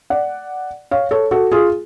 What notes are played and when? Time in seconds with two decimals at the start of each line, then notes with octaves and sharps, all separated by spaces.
0.10 D5 F#5
0.91 C#5 F5
1.11 A4 C#5
1.31 F#4 A4
1.52 F4 G#4